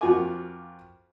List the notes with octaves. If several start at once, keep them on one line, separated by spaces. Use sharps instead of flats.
F2 F4 F#4 A#4 G#5 D6